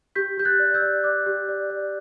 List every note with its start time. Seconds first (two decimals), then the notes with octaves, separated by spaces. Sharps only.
0.15 G4 G6 B6
0.37 G4 G6
0.45 F#6 A6
0.59 D5
0.74 E6 G6
0.82 D5
1.04 D5 D6 F#6
1.26 G4
1.49 D5
1.70 D5